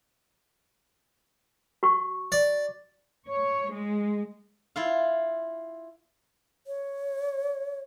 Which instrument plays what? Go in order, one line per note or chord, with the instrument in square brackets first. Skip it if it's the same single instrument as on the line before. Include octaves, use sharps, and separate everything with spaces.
[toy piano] F#4 C#6
[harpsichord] D5
[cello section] C#5
G#3
[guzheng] E4 F4 F5
[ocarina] C#5